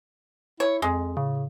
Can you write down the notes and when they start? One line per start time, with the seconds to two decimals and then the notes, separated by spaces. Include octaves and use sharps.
0.60 E4 C#5
0.82 F2 G#3
1.17 A2 C#3